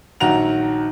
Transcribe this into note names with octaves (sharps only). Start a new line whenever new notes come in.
A#1 D#3 F#3 F#5 A#5 F7